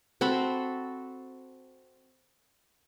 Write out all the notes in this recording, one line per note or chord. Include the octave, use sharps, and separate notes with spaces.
C4 F#4 A4 B5